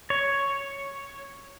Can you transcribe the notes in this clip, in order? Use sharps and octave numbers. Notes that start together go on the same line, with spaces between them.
C#5